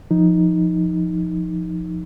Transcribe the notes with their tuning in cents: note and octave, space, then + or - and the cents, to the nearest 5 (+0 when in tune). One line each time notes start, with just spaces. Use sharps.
F3 +0 D#4 +5